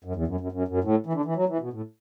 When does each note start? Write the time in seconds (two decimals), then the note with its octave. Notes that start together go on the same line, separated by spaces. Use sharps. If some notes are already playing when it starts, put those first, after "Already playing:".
0.04 F#2
0.16 E2
0.27 F#2
0.41 F#2
0.52 F#2
0.68 F#2
0.84 A2
1.06 E3
1.13 D3
1.25 E3
1.36 F#3
1.49 E3
1.61 B2
1.73 A2